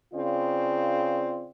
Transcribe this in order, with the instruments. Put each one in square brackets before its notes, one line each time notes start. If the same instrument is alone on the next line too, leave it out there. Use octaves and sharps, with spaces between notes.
[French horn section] C#3 C4 F4 D5